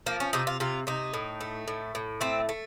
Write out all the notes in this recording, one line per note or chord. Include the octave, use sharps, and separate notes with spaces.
F3 A#3
C#4
C3 D#4
F4
C3 F4
C3 D#4
A2
A3
A2
A2
A3 C4
A3